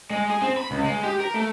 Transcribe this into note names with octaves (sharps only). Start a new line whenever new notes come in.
G#3
G#4
C4
B5
C#2
G#3
G4
A#4
A3